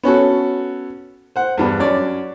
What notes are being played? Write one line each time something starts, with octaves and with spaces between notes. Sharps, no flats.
B3 C#4 F#4 A4
C5 F#5
E2 G2 B3
F#2 C#5 D5